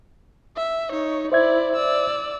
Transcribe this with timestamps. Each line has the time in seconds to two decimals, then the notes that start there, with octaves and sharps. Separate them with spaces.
0.57 E5
0.91 D#4 C#5
1.32 E4 C5 D5 E5 G#6
1.75 D5 E6